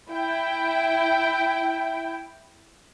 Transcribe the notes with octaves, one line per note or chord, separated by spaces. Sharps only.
E4 G5